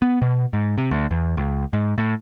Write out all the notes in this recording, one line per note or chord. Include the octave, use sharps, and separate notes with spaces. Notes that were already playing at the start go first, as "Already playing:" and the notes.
B3
B2
G#2
C3
D2
E2
C#2
G#2
A2